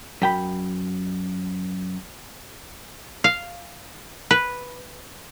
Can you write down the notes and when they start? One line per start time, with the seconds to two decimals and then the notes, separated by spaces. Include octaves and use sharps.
0.22 F#2 G5 B5
3.24 F5
4.31 B4